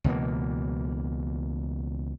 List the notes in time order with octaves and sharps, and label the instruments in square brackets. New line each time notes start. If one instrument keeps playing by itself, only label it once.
[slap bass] C#2 B2 E3 A#3